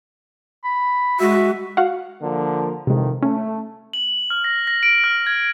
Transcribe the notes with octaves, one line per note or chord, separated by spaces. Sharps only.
B5
G#3 F#4 E5
F#4 F5 F#5
D3 F3 A#3
F2 C3 D#3 E3 G#3
A3 C#4
F#7
F6
A#6
A#6
D7
F6
G#6